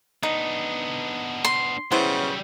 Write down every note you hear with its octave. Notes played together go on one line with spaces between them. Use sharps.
B3 D4 D#4
C6
C#3 F#3 G3 B3 E4 C5